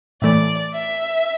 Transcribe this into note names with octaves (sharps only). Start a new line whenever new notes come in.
A2 E3 A3 D5
E5